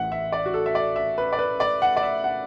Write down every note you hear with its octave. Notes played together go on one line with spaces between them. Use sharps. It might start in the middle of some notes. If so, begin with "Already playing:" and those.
Already playing: A1 A2 E3 E5 F#5
E5
D5
F#4
A4
E5
D5
E5
B4
D5
B4
D5
F#5
D5
E5
F#5